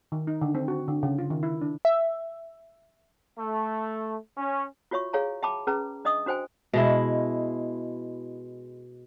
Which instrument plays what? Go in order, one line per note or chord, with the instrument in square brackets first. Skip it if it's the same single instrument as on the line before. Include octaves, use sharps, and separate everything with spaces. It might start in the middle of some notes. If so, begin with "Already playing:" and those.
[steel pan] D#3
D#4
D3
C4
F#4
D3
C#3
F4
D#3
E4
D4
[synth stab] E5
[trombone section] A3
C#4
[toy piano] F4 F#4 C#5 E5 C#6
G#4 C#5 F5 G#5 A#5
E5 G5 A5 B5 D6
C#4 G#4 B4 A#5
D4 D#5 E5 D#6
D4 F#4 C5 G5 G#5
[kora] B2 G#3 E4